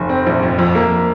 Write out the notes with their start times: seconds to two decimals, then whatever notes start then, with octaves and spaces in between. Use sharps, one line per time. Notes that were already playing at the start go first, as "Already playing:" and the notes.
Already playing: F1
0.09 C4
0.27 A#1
0.43 F2
0.59 F2
0.75 A#3